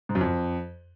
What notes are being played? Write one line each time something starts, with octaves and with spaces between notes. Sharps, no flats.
G#2
F#2
F2